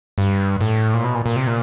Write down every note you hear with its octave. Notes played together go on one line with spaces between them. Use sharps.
G2
A2
A#2
B2
A#2
A#2
C3
A#2